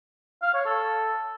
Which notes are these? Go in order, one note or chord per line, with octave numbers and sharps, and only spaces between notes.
F5
C#5
A4